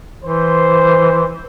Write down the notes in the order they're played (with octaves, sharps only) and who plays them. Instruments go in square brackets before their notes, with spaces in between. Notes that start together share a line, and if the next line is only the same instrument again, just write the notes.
[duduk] E3 [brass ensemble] C5